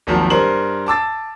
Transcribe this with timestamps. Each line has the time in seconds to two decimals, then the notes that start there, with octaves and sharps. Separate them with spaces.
0.07 G#1 D#2 D#3 F3 F#3 A5
0.30 G2 A#4 C5 F#7
0.87 A5 D6 E6 A6